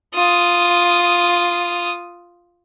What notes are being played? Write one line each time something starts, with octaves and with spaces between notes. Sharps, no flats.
F4 D#6